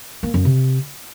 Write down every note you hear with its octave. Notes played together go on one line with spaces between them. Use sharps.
A#3
F#2
C3